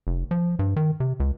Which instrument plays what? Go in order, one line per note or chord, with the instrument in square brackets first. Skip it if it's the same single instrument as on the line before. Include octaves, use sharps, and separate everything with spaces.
[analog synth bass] F1
F3
G2
D#3
C3
C#2